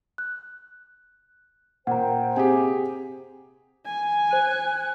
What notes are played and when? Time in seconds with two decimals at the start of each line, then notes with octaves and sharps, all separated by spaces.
0.18 F#6
1.87 A#2 C5 F#5 G5 A#5
2.36 C3 G4 G#4 G#5
3.86 G#5
4.31 C5 F#6 D#7